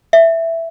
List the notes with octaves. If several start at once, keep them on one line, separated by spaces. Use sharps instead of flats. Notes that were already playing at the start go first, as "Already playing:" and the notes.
E5